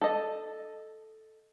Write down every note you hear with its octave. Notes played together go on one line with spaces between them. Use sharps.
A4 D#5